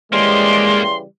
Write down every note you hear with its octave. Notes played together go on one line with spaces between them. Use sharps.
C#3 E3 G3 G#3 A#3 G4 C6